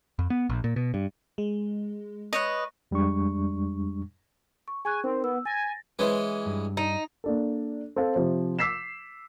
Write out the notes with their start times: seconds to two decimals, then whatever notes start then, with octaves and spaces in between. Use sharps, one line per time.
0.19 F2
0.30 B3
0.50 A#1
0.64 A#2
0.76 B2
0.94 G2
1.38 G#3
2.33 B4 C#5 D#5
2.91 F2 G3 G#3 D4 C#6
4.68 C#6
4.85 G#4 G#5 C#6 F#6
5.04 C4 D#4 A#4
5.24 B3 E6
5.45 G#5 A6 A#6
5.99 E3 G#3 C#4 B4 C5
6.46 G2
6.77 D#4
7.24 A#3 D4 A4
7.96 C4 A4 F5
8.15 C3 F3 C5
8.59 D6 E6 B6 C7 E7